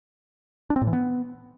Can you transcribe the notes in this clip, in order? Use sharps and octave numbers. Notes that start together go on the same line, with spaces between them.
D4
C4
A2
E3
B3